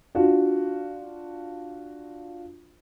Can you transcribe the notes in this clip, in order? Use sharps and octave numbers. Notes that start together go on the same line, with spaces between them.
D4 F4 F#4